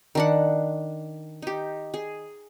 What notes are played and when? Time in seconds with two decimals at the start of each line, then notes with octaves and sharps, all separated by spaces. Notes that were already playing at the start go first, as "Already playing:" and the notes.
0.15 D#3 D4 F#5
1.42 D#4 G4
1.94 G#4